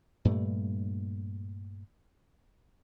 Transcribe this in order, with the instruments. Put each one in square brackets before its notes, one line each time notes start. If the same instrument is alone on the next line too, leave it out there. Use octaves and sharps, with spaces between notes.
[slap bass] G2 A#2 G3 A3